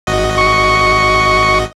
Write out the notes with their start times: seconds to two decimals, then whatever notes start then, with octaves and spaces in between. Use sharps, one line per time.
0.07 G#1 F#4 D#5
0.38 C#6